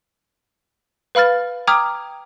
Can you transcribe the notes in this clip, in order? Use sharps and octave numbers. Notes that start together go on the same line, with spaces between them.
B4 F5 B5 F6 A6
G5 A#5 D6 D#6 F6 G#6